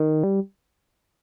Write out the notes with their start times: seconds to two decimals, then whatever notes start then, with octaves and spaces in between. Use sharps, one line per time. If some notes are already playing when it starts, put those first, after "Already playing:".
Already playing: D#3
0.24 G3